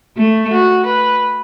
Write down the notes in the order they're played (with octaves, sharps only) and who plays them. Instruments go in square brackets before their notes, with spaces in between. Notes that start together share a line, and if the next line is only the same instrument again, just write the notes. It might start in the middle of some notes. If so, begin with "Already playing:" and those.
[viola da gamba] A3
[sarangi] F#4
B4